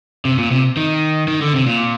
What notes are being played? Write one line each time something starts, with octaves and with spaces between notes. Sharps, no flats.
C3
A#2
C3
D#3
D#3
D3
C3
A#2